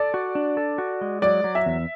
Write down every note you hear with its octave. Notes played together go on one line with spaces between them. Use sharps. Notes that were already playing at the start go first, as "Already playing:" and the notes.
Already playing: A4 D5
F#4
D4
A4
F#4
G#3
F#3 D5
F#3
E5
E2